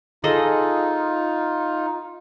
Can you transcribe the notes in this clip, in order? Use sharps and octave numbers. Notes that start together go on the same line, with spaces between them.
D#4 F4 G#4 A4 D#5